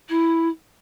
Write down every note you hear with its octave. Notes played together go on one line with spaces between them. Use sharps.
E4